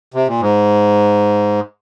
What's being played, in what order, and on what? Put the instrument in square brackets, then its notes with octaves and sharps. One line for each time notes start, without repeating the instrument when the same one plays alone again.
[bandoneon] C3
A#2
G#2